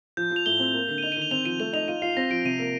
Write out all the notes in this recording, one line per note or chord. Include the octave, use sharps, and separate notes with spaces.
F3 G6
F3 F7
A2 G7
C4
A#3
D3
D#7
D#4 F7
D#7
D#3 F7
C4 F7
F3 D#7
A3 F7
D#4 F7
F4 D#7
F4 C7
C4 A#6
F3 D7
C3 D#7
A#3